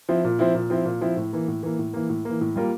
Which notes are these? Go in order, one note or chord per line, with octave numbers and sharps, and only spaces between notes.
F3 C4 E4
A#2
F3 C4 E4
A#2
F3 C4 E4
A#2
F3 C4 E4
A2
E3 A#3
A2
E3 A#3
A2
E3 A#3
A2
E3 A#3
A2
G3 A#3 F4 A#4